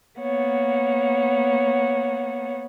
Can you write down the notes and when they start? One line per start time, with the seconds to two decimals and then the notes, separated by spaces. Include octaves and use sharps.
0.19 A#3 B3 C#5 F#5